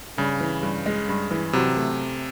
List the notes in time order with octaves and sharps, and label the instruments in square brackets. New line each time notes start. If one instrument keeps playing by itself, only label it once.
[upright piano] G2 [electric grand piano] C#3
[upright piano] E3
G2
G#3
G2
E3
[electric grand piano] C3 [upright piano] F#3
[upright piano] A3